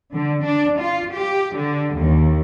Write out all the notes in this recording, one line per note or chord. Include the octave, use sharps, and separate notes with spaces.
D3
D4
F4
G4
D3
D#2